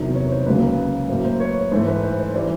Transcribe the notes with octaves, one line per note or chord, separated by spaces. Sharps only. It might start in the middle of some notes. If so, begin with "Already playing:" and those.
Already playing: E2 C3 D#3 F#3
B4 C#5
C5
C#2 C#3 F#3 A#3 B4
B4
A2 F#3 A#3 C5
C5
B4 C#5
G#2 E3 A3 C5
B4
C5
C5
E3 G3 C5 D5